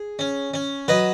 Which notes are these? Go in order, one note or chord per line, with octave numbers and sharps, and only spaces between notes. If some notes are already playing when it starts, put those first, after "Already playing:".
Already playing: G#4
C#4
C#4
F#3 B4 D#5